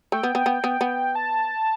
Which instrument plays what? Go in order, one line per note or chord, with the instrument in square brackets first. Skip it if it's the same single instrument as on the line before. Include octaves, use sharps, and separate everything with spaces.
[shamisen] A3 [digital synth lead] G5
[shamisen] B3
B3
B3
B3
B3
[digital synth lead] A5